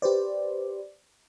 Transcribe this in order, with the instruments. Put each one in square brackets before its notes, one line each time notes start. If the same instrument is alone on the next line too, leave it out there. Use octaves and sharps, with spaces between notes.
[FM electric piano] G4 B4 C5 D5